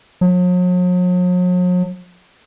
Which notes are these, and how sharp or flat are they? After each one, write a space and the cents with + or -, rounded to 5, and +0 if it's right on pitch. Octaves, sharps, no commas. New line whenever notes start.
F#3 -45